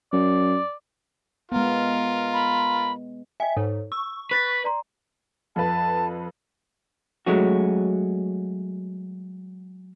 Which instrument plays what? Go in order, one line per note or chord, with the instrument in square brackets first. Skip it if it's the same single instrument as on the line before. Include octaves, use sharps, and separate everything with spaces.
[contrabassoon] F#2 [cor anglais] D5
[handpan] G#3 B3 [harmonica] F4 A#4
[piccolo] B5
[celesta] D#5 G5 G#5 [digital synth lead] E5
[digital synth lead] G#2 [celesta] A4 C#5
[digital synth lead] C#6 [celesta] E6
[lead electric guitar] B4 [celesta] F#6 A6 B6
[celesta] D5 A#5 C6
[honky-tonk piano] F2 B4 [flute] A5
[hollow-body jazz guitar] F#3 G#3 A3 C#4 F#4